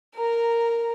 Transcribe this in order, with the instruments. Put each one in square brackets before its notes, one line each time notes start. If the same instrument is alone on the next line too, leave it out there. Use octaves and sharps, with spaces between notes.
[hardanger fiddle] A#4 A#5